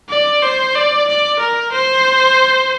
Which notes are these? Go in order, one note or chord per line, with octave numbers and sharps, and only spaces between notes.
D5
C5
D5
D5
A#4
C5